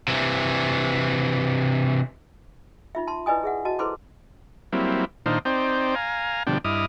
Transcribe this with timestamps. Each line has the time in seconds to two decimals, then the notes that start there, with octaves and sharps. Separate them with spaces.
0.08 C3 E3
2.95 D#4 F4 E5
3.07 A5 C6
3.26 E4 B4 D5 D#5 G#5 D#6
3.43 G#4 E5 F#5
3.65 F#4 D#5 A5
3.79 E4 A4 B4 C5 C6 D6
4.72 F#3 G3 A#3 C4 E4
5.26 A#2 D#3 D4 D#4 C5 F5
5.45 C4 D#4 C5 D5 G5
5.95 F5 G#5 A#5
6.47 B2 D3 F3 G3 D4 G5
6.65 G2 E4 D#5 D6 D#6 F6